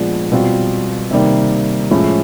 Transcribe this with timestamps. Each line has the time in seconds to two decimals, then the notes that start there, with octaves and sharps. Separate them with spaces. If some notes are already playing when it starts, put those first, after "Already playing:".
Already playing: A#2 F3 G#3 B3 D4
0.32 B2 G3 C4 F4
1.11 C3 D#3 G3 A#3
1.91 A2 F3 G#3 C#4